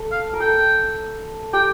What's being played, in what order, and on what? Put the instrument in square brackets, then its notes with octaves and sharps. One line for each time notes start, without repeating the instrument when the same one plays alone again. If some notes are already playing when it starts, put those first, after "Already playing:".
Already playing: [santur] A4
[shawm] F5
[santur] A#4
[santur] A4 [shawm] G5
[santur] G4 [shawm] G5